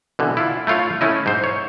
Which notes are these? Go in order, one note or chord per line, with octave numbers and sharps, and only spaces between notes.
B2 D3 E3
E4 F4
A3 E4 F4 C#5 F5
A3 C#4 E4 D#5
G#2 C5
C#5